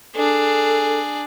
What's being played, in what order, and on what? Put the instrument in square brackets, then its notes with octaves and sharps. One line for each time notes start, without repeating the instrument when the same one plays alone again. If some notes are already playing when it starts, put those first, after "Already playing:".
[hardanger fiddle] D4 G#4 [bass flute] A4